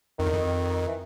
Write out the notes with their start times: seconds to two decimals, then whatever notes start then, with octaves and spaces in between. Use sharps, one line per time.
0.18 F2 D#3
0.26 E2
0.34 F2
0.88 E3